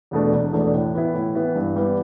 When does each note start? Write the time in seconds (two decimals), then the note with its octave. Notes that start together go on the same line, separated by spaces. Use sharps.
0.11 E2 B2 A3 D4
0.32 E1
0.53 E2 B2 A3 D4
0.74 A2
0.94 E3 B3 E4
1.14 A2
1.35 E3 B3 E4
1.55 G2
1.76 E3 G3 B3